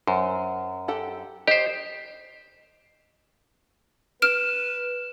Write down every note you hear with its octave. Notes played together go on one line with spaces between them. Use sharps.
F#2 C5
G4 A4 F#5
G4 C5 D#5
B4 F6 D7 E7